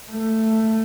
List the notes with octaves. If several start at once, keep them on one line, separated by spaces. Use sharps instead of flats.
A3